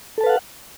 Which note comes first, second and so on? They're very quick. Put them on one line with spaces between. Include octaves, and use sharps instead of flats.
A4 A5 B4 F5 F#5